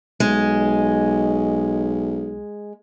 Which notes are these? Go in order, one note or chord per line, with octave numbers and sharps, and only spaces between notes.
B1 G#3